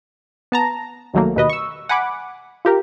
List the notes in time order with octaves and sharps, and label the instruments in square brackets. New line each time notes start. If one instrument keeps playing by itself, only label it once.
[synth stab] B3 A5 A#5
C2 D#3 F#3 A3 A#3
D#2 B2 B4 D#5
C#6 E6
F#5 G#5 B5 D6
F4 G4 A#4